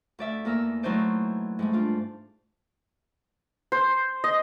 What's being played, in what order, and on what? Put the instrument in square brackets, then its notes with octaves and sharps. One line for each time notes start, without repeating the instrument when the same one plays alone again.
[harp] D2 D5 E5
E2 A#3 A#4 E6
E3 F#3 A3 D#4 C5 D5
G#2 G3 A3
D4 F4
[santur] C5
D#5